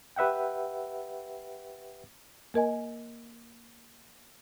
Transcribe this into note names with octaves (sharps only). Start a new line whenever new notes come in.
G4 B4 E5 F#5 G5
A#3 A#4 D#5 G#5